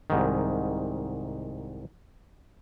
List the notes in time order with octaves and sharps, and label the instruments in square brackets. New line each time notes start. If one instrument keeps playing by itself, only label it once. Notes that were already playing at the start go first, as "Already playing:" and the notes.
[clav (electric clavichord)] C2 G#2 D#3